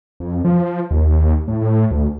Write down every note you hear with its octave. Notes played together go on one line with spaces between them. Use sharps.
F2
F3
D#2
A2
A2
D2